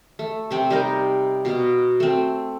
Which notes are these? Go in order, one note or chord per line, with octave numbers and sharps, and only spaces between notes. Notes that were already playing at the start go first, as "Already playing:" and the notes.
A3
C3 C4 G5
G3 D#4 A#4 D#5
B2 F#4 F5 A#5
A3 C4